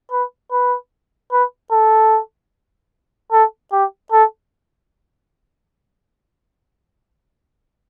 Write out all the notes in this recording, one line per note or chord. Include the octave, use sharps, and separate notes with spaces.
B4
B4
B4
A4
A4
G4
A4